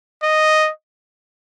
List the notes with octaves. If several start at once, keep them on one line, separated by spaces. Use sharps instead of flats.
D#5